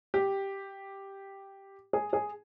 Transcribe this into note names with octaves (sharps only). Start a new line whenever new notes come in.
G4
G#4
G#4